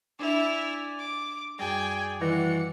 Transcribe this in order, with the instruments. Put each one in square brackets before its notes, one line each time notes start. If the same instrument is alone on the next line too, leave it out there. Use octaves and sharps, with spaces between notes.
[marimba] D4 E5 [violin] E4 F7 [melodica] D5 G#5
[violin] D6
[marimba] F#2 G3 [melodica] G#4 D5 [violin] G5 G#5
[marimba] D#3 G3 [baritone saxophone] E3 [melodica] F#4 D5 F#5 [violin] C#7